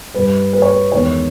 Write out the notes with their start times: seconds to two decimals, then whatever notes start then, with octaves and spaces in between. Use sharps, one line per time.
0.14 G2 G3 B4
0.53 B4
0.62 C#5
0.71 B4
0.92 E2 D#3 G#3 C#5